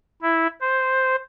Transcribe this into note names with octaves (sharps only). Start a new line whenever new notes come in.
E4
C5